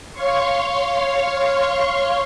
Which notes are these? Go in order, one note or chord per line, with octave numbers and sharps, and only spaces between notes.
C#5 F5 C6 C#6